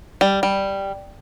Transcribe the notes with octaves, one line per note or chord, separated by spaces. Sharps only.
G3
G3